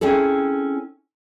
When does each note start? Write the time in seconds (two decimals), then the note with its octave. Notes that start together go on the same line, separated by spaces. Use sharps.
0.01 C4 C#4 E4 G#4 A4